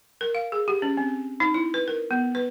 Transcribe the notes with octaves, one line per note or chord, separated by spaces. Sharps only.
A#4
F5
G#4
G4
C#4
C4
D#4
E4
B4
A#4
B3
B4